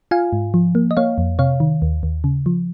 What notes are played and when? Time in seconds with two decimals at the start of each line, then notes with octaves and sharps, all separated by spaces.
0.11 F4 F5 G#5
0.33 G#2
0.54 F3
0.75 A#3
0.91 D#5
0.97 A#3 C#5 F5
1.18 F2
1.39 C3 C#5 F5
1.60 D#3
1.82 D#2
2.03 D#2
2.24 C#3
2.46 F3